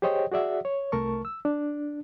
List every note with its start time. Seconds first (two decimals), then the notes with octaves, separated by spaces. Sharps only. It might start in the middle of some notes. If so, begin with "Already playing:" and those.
0.02 G4 G#4 C5 C#5 D#5 G5
0.32 F#4 G#4 D5 E5 F#5
0.65 C#5
0.92 C2 A3 A#4 A5 C#6
1.25 E6
1.45 D4